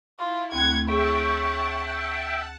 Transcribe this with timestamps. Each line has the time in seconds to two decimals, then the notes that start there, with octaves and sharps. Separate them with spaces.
0.19 E4 F4
0.52 D2 A3 C4 F#5 G5 G#6
0.88 G#4 A4 C#5 E5 F#5 G5 A5